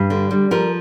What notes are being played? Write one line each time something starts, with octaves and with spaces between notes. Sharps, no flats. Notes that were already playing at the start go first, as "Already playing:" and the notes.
Already playing: G2
D3
G3
F3 A#4